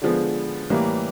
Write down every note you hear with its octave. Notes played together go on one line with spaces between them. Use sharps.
D3 F3 G#3 B3
A2 E3 G3 A#3